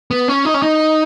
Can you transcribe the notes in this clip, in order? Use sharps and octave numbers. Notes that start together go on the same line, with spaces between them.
B3
C#4
D#4
C#4
D#4